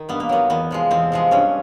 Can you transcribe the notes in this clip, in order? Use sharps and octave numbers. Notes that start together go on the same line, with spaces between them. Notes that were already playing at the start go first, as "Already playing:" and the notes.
Already playing: D#3
G2 B3
A#3
D#3 F#3 B3
E2 B3
C3 F3 G#3
E2 C4
C3 F3 G#3
G2 C#4